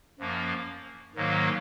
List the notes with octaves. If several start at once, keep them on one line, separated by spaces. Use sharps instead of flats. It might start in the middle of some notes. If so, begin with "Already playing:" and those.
F#2 F3 A#3
G#2 D#3 F#3 A#3